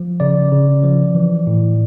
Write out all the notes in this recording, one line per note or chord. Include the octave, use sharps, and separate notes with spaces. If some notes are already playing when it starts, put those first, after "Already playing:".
Already playing: F3
C#3 D5
C#3
F3
E3
A2